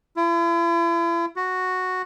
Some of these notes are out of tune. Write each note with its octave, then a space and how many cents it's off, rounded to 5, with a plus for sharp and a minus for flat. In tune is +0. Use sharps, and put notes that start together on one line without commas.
E4 +40
F#4 -5